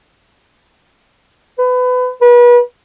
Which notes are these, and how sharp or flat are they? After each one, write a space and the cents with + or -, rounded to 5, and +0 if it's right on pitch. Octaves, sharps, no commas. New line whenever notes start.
B4 +25
B4 -35